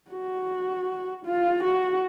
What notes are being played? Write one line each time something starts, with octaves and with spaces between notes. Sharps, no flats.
F#4
F4
F#4